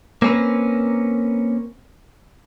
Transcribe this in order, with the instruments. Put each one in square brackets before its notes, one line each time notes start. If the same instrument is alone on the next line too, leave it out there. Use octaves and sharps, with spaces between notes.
[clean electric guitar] A#3 C4 C#4 A#4 B4